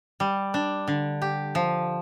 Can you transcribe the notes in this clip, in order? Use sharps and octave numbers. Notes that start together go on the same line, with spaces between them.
G3
D4
D3
G4
F3